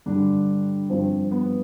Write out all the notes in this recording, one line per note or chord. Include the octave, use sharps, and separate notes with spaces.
G2 D3 G3 D4
G2 F3 C4
B3